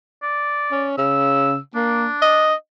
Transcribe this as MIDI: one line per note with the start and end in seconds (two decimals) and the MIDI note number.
0.23 0.87 74
0.71 0.97 61
0.98 1.58 49
0.98 1.57 88
1.75 2.07 58
1.75 2.52 62
2.22 2.54 75